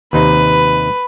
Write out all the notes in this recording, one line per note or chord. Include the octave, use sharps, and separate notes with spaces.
D#2 C3 D#4 B4